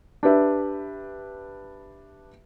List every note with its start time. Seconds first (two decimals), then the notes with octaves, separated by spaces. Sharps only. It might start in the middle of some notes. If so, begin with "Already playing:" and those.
0.23 D4 G4 B4 E5